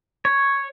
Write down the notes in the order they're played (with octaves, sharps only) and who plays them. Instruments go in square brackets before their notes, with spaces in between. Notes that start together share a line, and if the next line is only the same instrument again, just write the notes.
[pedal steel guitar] C#5